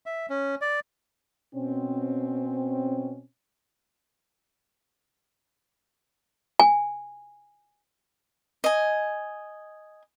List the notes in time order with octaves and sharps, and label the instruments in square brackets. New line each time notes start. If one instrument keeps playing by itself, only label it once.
[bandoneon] E5
C#4
D5
[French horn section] B2 C4 C#4
[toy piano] G#5
[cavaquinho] D#5 G#5